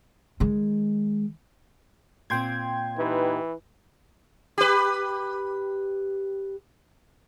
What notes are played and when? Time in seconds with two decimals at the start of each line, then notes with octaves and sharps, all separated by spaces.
0.40 D#3 G#3
2.30 A#2 C4 G5 C6 G#6
2.98 E3 D#4 G4 B4
4.58 G4 B4